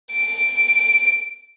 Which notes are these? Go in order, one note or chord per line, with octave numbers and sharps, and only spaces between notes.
D7